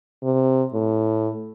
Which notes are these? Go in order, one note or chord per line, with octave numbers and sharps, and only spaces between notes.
C3
A2